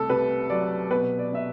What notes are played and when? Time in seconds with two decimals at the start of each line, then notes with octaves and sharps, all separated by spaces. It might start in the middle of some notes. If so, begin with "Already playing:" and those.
Already playing: C2 A3 A4
0.10 C3 B4
0.50 F#3 D5
0.90 B2 B4
1.19 D5
1.32 B2 E5